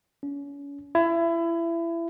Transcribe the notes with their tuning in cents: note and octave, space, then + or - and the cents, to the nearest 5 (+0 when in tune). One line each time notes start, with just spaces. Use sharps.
C#4 +35
E4 +25